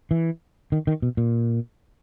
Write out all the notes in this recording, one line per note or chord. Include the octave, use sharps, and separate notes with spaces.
E3
D#3
D#3
B2
A#2